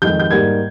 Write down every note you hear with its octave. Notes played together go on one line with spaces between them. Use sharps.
F2 D#3 G#3 G6
G6
G#2 G3 A#3 G#6